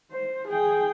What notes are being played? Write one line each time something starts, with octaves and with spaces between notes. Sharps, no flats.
C5
G#4 G5